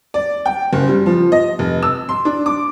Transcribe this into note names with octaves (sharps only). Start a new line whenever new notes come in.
D5
G5
F#1
G3
F3
D#5
F1
E6
C6
D4
D6